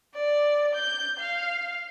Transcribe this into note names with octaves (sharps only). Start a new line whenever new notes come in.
D5
G6
F5